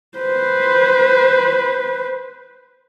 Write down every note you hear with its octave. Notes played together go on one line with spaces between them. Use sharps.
B4 C5